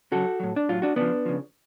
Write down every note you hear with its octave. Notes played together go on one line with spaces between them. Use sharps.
C#3 F#3 F#4 A4
A2 F#3
D4
A2 F#3 F4
D4 F#4
C#3 F3 B3 D4
C#3 F3